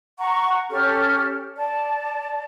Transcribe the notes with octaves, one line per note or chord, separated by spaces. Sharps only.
F#5 A#5 C#6
C#4 G4 A4 F6
D5 A5